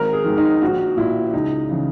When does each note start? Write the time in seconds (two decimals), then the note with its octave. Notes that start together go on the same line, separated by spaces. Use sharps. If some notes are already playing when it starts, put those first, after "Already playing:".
Already playing: G#1 A#4
0.13 G#4
0.25 G#2 D#3
0.37 D#4
0.62 A#1 F#4
0.97 A#2 E4
1.34 C#2 D#4
1.69 C#3 E3